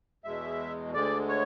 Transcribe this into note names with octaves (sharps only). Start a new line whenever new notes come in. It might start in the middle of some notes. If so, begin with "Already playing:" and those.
E2 B2 G#3 E5
D2 D3 G#3 D5
C#5